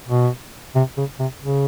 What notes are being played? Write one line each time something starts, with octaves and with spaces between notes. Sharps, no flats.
B2
C3
C#3
C3
C#3